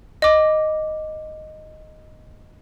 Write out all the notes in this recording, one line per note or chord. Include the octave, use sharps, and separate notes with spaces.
D#5 D6